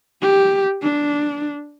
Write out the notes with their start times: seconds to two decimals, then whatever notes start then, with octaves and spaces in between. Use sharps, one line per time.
0.22 G4
0.82 D4